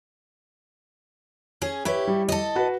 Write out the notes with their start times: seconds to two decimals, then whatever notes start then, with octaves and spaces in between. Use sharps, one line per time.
1.62 C#4 G#4
1.85 E4 G4 B4 C#5
2.07 G3
2.29 A4 D#5
2.55 F#4 B4